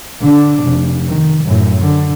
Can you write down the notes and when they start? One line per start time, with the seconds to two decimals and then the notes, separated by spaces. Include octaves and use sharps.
0.21 D3 D4
0.63 F1
1.08 D#3
1.44 F#2 A2
1.82 D3